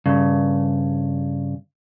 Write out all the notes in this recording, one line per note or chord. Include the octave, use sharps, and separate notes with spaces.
G2 C#3